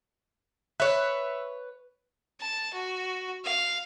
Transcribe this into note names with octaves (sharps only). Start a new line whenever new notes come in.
B4 C#5 E5 F#6
A5
F#4
F5